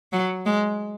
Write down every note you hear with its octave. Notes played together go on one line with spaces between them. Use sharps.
F#3
G#3